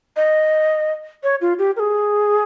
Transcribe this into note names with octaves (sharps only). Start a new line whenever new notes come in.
D#5
C#5
F4
G4
A#4
G#4